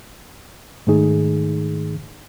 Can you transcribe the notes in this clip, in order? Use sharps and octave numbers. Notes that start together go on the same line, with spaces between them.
G#2 D#3 A3 D#4 G#4